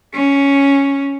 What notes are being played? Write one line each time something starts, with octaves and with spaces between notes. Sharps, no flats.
C#4